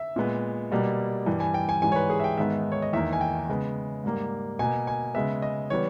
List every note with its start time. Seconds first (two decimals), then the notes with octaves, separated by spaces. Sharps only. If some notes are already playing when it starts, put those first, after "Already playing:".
Already playing: E5
0.16 A#2 G#3 B3
0.72 B2 G3 A#3
1.26 G2 E3 G3
1.40 G#5
1.54 G5
1.69 G#5
1.82 G#2 E3 G3 G#5
1.92 C#5
1.96 B4
2.10 G#4
2.20 E5
2.24 G5
2.38 G#2 D#3 G#3 B3 E5
2.72 C#5
2.82 D#5
2.93 E2 D#3 A#3 E5
3.13 G#5
3.21 G5
3.49 C#3 G#3 B3
4.04 G#2 G3 A#3
4.59 B2 A#3 G#5
4.87 G#5
5.14 C#3 G#3 B3 E5
5.42 D#5
5.70 E3 G3 B3 C#5